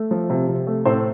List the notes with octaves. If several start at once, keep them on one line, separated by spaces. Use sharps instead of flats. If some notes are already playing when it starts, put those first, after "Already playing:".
Already playing: A3
F3
C3
C3
A3
A2 C4 C5